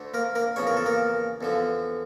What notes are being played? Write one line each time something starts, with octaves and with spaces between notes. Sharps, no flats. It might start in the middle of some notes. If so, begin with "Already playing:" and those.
Already playing: D2 D3 A3
A#3 A#4
A#3 A#4
E2 C#3 F3 C#5
A#4
A4
A#3 A#4
E2 D3 F3